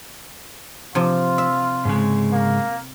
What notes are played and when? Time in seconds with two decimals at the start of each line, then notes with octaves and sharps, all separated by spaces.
0.95 C3 F3 F4
1.38 E5
1.85 G#2 C#3 G#3
2.33 A#3